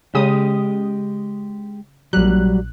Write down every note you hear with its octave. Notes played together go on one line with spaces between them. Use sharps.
C#3 G#3 G4 D#6
A#1 F#3 G3 F#6